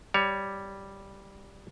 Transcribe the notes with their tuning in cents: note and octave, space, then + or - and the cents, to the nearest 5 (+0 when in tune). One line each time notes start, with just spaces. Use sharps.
G3 +0 C#5 +15